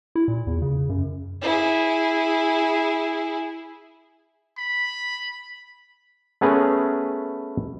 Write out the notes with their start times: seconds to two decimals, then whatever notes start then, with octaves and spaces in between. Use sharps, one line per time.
0.15 E4
0.28 A#2
0.47 E2
0.62 C#3
0.89 F#2
1.42 E4 G#4
4.58 B5
6.41 A3 B3 C#4 G#4 A#4 B4